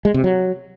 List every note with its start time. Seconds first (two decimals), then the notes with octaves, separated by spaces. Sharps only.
0.05 G#3
0.14 C3
0.24 F#3